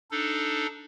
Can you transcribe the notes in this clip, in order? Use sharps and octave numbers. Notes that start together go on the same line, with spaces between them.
D4 D#4 A4